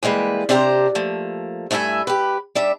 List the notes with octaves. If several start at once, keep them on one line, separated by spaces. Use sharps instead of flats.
E3 G3 G#3 A#3 B4
C3 D4 G4 C5 E5 A#5
F3 A3 A#3
G2 A3 E4 E5 G#5
G4 B4
G3 D4 E5